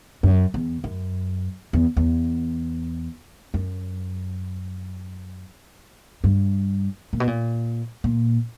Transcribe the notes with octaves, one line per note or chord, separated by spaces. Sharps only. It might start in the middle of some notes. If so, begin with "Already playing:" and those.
F#2
E2
F#2
E2
E2
F#2
G2
A#2
B2
A#2
A#2